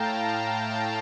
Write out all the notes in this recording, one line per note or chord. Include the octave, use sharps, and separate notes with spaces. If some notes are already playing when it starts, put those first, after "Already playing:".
Already playing: A2 F5 G5 A5 A#5